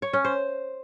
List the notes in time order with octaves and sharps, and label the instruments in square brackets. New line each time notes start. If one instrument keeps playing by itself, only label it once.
[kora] C#5
C#4
C5